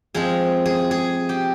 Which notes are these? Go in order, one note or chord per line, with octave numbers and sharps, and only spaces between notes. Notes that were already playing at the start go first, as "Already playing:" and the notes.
F3 G#3 C4 G#4
G#4
G#4
G4